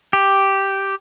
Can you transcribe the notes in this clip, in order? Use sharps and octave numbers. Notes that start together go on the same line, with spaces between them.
G4